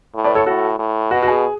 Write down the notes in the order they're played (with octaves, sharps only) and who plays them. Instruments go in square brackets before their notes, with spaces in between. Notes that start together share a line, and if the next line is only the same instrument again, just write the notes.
[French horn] A2
[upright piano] B4 D5
A4 C#5
[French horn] A2 [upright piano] F#4 A4
[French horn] A2
[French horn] B2 [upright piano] F#4
[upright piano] F#4
G#4